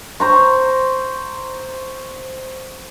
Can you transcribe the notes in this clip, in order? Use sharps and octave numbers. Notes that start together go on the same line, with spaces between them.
C5 A#5 C#6